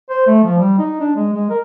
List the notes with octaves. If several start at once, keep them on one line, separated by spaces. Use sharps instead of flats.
C5
A3
F3
G3
D#4
D4
G#3
G#3
A#4